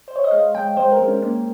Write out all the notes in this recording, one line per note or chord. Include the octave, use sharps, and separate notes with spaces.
C5
C#5
D#5
G#3 F5
G#3 G5
G#3 C5
A#4
G#3
C#4
A#3 C#4